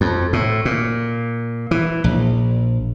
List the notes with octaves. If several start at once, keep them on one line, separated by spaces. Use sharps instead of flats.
F2
A2
A#2
E3
A#1